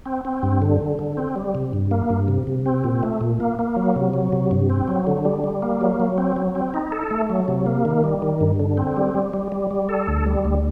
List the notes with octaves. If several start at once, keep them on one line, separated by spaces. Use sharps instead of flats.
C4
C4
G2
D3
D3
D3
C4
G3
C3
G2
A#3
G2
C3
C3
C4
A#2
A3
A#2
A#3
A#3
F#3
C3
F#3
C3
G2
C4
F#3
D3
G3
G3
A#3
F#3
F#3
C4
F#3
C4
D#4
A4
A3
F#3
C3
A#3
D#3
G3
D#3
G2
D3
C4
G3
G3
G3
G3
G3
A4
D2
G3
D2